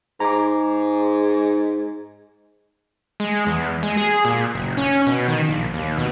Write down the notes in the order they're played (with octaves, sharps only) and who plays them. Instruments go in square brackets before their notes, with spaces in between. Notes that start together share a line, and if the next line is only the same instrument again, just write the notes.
[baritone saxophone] G#2 [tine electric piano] A#5 D6
[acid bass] G#3
E2
G#3
G#4
A#2
F#1
C#4
B2
D#3
A#1
D#2
B2